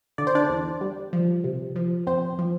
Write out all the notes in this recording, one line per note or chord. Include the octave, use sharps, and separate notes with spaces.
D3 D5
C5
D4 D5
E2
G3
F3
C3
F3
F2 C4 C5
F3